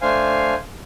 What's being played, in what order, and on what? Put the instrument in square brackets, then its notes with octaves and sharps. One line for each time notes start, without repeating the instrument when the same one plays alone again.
[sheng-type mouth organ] A3 D4 C5 F5 G#5